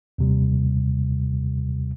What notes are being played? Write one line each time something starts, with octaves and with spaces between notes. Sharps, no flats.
D#2 C3 G3